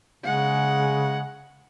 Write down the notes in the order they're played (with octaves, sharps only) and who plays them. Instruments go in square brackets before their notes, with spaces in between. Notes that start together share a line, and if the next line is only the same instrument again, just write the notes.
[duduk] C#3 [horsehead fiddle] G#3 F#5